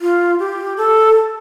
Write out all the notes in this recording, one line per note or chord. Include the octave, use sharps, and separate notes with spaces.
F4
G4
A4